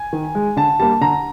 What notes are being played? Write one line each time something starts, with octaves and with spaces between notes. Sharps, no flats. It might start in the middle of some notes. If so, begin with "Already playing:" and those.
Already playing: G#5
D#3
G#3
D3 A5
G3 A#3 A5
D3 A#5